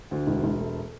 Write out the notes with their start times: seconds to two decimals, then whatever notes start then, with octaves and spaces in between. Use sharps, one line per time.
0.11 D2
0.27 E1
0.44 E1
0.59 A3